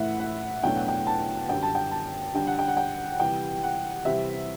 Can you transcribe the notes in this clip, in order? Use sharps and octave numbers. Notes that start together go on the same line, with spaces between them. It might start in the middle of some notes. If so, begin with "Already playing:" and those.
Already playing: A2 E3 A3 E4 E5 F#5
F#5
E2 B2 F#3 A3 D4 G5
F#5
G5
A5
F#2 D3 G3 G5
A5
G5
A5
D3 G3 D4 G5
F#5
G5
F#5
G5
F#5
C3 E3 G3 G5
F#5
C3 E3 G3 C4 E5